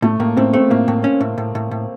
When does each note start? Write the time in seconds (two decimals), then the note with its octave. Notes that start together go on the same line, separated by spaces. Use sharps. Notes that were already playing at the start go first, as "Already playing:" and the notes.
0.02 A2 A3
0.19 A2 A#3
0.37 A2 C4
0.53 A3 C4
0.70 A2 A#3
0.88 A2
1.04 C#4
1.21 A2
1.38 A2
1.55 A2
1.71 A2